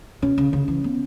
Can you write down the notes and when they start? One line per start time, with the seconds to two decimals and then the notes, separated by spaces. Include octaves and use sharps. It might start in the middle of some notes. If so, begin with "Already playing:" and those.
0.22 B2 C#4
0.38 C#3
0.53 C#3
0.68 E3
0.84 B3